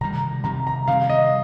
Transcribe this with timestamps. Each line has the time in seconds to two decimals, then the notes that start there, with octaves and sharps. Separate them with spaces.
0.01 C3 D#3 G3 A#5
0.44 C3 D#3 G3 A#5
0.67 A#5
0.88 C3 D#3 G3 F5
1.09 D#5